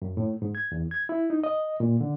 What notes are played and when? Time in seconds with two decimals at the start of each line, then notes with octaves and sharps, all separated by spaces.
0.02 F#2
0.17 A2
0.42 G#2
0.55 G#6
0.72 E2
0.91 G#6
1.09 E4
1.30 D#4
1.44 D#5
1.80 A#2
2.01 D3